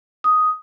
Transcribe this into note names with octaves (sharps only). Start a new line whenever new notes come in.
D#6